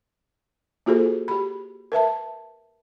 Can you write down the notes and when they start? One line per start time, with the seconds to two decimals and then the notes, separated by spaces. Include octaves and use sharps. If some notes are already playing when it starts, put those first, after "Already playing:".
0.86 A#3 F4 F#4 G#4 A4 C5
1.28 G4 B5
1.92 A#4 B4 E5 A5